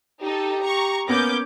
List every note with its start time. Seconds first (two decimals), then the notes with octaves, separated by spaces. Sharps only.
0.22 D#4 G4 A4
0.62 A#5 C#6
1.08 A#3 B3 C#4 D6 G6 A#6